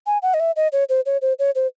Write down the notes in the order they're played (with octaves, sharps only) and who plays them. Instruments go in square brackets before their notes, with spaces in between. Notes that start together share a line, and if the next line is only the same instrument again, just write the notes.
[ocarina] G#5
F#5
D#5
E5
D#5
C#5
C5
C#5
C5
C#5
C5